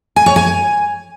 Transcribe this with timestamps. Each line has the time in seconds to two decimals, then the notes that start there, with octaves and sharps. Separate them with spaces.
0.16 G#5
0.26 C#5
0.36 G#5